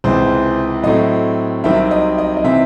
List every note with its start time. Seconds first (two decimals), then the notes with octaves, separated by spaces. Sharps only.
0.04 C#2 C3 E3 C5
0.83 A2 F#3 A3 C4 D#5
1.64 C2 C3 D#3 F#3 C4 E5
1.91 D#5
2.18 D#5
2.37 D#5
2.44 C3 E3 C4 E5